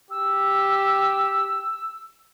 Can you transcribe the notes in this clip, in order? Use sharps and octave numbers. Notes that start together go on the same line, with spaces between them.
G4 E6